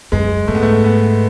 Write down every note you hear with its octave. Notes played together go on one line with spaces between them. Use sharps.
F#2 G#3
G#2 A3
B3
A3
B3